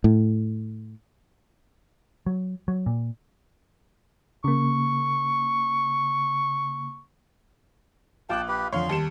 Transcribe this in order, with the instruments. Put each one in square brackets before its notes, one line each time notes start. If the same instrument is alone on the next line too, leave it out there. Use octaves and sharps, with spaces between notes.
[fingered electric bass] A2
[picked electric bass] F#3
F#3
A#2
[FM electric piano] C#3 A#3 [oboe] C#6
[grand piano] A#1 D6 F#6 [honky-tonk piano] F4 [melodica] G5 A5
[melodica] G4 B4
[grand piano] F2 D3 F3 [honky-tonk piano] C#5 F5 [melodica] C6
[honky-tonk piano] D#2 C#7 E7 [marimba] D#3 G3 G4 [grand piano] A5